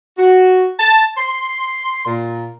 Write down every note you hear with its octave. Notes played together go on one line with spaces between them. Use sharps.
F#4
A5
C6
A#2